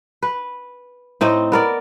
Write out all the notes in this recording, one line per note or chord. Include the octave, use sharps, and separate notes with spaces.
B4
A2 C4 D#4 D#5
B3 A#4 D5